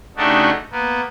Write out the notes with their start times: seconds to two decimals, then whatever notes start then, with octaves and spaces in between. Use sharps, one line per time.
0.17 C#3 A3 D4 D#4 F#4 G4
0.72 A#3 B3